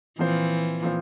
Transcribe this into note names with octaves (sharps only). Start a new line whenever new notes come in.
A#2 E3 F3 C4 F4 C5
A#2 F3 C4 F4 C5